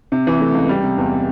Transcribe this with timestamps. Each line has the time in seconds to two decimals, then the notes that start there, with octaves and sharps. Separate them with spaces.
0.12 C3
0.27 E3
0.40 A3
0.54 C#2
0.69 G3
0.83 C3
0.98 E2